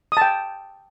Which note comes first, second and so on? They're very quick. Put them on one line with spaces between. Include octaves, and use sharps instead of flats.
D#6 A5 G5